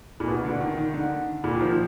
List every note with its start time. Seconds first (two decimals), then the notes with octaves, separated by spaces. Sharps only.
0.20 A#2
0.27 B2
0.44 D3
0.61 D#3
0.77 D#3
0.94 D3
1.44 A#2
1.55 D#3
1.61 F3